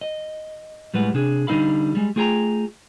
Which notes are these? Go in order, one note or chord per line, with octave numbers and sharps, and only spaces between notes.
D#5
A2 G3 G#3 B4 F#5
C3 D4 G#4
D3 G3 D#4 A4 F5 B5
G3 G#3
A3 F4 G#4 G5 G#5 A#5